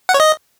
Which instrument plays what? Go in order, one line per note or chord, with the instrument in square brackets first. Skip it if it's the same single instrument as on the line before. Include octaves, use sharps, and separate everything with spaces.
[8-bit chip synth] F#5
C#5
D#5